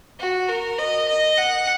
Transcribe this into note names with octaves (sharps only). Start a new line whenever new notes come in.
F#4
A#4
D#5
D#5
F#5